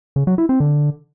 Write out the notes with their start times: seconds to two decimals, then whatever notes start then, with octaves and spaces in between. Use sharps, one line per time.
0.16 C#3
0.27 F#3
0.38 E4
0.49 C4
0.60 D3